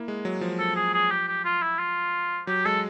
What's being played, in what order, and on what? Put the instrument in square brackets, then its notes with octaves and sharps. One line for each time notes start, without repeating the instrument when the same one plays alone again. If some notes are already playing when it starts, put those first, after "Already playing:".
Already playing: [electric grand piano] A#3 E4
G#3
F#3
F3
[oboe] A4
G#4
G#4
G4
G4
F4
E4
F4
[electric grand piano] F#3 [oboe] G4
[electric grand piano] G#3 [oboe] A4